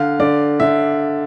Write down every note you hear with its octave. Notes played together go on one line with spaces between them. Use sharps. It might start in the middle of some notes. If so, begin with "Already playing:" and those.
Already playing: D3 F5
D3 D5
D3 E5